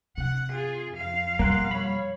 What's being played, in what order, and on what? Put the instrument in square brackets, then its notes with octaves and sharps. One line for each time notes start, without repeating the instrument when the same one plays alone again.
[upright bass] C3 [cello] F#5
[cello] F4 G#4
F2 F5
[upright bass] B2 G3 [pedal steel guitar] A#3 F#5 C6
[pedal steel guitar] C#5 B5